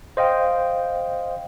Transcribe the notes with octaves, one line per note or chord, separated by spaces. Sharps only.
C5 D#5 F5 G5